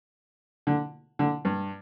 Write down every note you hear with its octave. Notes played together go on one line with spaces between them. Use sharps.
D3
D3
G2